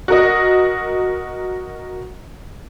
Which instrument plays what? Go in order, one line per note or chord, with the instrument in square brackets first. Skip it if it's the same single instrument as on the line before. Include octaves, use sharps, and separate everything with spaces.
[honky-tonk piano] F#4 A#4 D#5